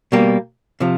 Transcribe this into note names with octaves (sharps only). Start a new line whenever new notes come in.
B2 G3 A#3
C3 F3